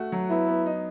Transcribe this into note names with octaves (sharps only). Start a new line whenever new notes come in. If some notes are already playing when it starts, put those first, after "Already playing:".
Already playing: A3 F#4
F#3
B3 E4
B3
D#4